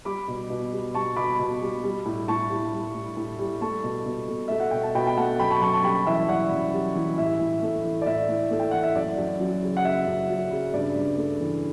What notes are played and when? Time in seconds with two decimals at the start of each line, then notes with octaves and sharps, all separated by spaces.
0.05 G3 B5 D6
0.28 B2
0.50 B2
0.72 G3
0.95 G3 A5 C#6
1.16 B2 B5 D6
1.39 B2
1.62 G3
1.84 G3
2.05 A2
2.28 A2 A5 C#6
2.50 G3
2.73 G3
2.94 A2
3.17 A2
3.39 G3
3.61 A3 A5 C#6
3.84 B2
4.06 B2
4.28 A3
4.48 A3 E5
4.60 F#5
4.71 B2 G5
4.83 A5
4.95 B2 G5 B5
5.07 G5
5.17 A3 F#5 A5
5.39 F#2 G5 B5
5.51 A5 C#6
5.62 F#2 A5 C#6
5.73 A5 C#6
5.84 G3 G5 B5
6.06 E3 E5 G5
6.28 F#2 D5 F#5
6.51 F#2
6.73 G3
6.95 E3
7.17 A2 E5
7.40 A2
7.62 A3
7.84 E3
8.01 D5
8.06 A2 E5
8.29 A2
8.51 A3
8.59 G5
8.71 E3 F#5
8.83 E5
8.95 F#2 D5
9.18 F#2
9.40 F#3
9.62 C#3
9.77 F#5
9.84 F#2 E5
10.07 F#2
10.29 F#3
10.51 C#3
10.73 G2 D5
10.96 G2
11.18 A3
11.40 E3